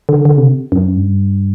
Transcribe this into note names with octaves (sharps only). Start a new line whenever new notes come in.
D3
D3
C3
F#2
G2